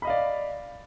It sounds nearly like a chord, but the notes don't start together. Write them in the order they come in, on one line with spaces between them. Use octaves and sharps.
B5 D#5 F5 D5